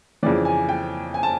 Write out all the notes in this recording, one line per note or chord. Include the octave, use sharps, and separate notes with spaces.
F2 C#3 E3 D5
G#5
G5
G#5
A5